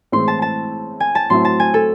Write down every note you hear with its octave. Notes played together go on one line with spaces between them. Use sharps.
A2 E3 G#3 C4 E4 C6
A5
A5
G#5
A5
A2 F#3 C4 E4 C6
A5
G#5
A4